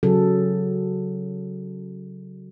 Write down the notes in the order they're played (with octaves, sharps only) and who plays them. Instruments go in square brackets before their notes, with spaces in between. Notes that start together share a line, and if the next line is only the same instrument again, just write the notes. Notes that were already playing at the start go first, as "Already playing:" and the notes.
[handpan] C#3 F#3 G#4 A4